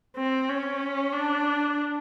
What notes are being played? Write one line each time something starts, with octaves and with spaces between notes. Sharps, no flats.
C4
C#4
D4